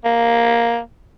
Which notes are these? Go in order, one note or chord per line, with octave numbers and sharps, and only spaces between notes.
A#3